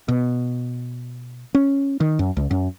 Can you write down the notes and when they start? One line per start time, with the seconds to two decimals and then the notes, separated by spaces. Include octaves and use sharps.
0.08 B2
1.55 C#4
2.00 D#3
2.19 F#2
2.37 C#2
2.51 F#2